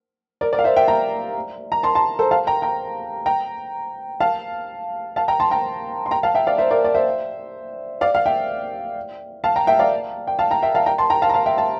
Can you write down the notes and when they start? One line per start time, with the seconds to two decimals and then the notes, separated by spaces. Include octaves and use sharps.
0.41 A#4 D5
0.53 A#4 D5
0.59 F5
0.64 C5 E5
0.76 E5 G5
0.88 G5 A#5
1.72 A#5
1.83 A5 C6
1.95 A5 C6
2.19 A4 C5
2.31 F5 A5
2.47 G5 A#5
2.62 G5 A#5
3.26 G5 A#5
4.20 F5 A5
5.16 F5 A5
5.28 G5 A#5
5.40 A5 C6
5.51 G5 A#5
6.06 C6
6.11 G5 A#5
6.23 F5 A5
6.35 E5 G5
6.47 D5 F5
6.58 C5 E5
6.70 A#4 D5
6.84 D5
6.94 C5 E5
8.01 D5 F5
8.15 F5
8.26 E5 G5
9.44 F5 A5
9.56 G5 A#5
9.67 E5 G5
9.79 D5 F5
10.27 G5
10.39 F5 A5
10.51 G5 A#5
10.63 E5 G5
10.75 F5 A5
10.86 G5 A#5
10.98 A5 C6
11.10 G5 A#5
11.22 F5 A5
11.29 A#5
11.34 F5 A5
11.46 E5 G5
11.57 F5 A5